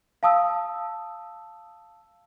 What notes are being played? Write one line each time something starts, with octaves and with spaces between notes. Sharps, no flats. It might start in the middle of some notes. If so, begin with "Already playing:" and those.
F5 A5 D#6 E6